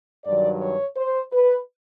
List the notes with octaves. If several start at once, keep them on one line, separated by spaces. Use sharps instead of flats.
G2 D#3 F#3 D5
C#5
C5
B4